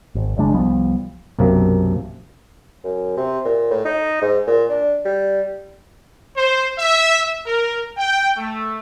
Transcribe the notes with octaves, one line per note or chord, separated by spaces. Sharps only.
G#1
F#1 C#3 G#3 D4
C2 F3 G3 B3
B1 F#2 C3 A#3
F#2
C3
A#2
A2
D#4
G#2
A#2
D4
G3
C5
E5
A#4
G5
A3